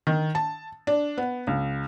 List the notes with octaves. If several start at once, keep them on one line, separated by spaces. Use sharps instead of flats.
D#3
A5
D4
B3
C#2